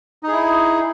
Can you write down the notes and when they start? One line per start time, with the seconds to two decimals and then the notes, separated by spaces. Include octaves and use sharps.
0.23 D#4
0.28 G#4
0.32 E4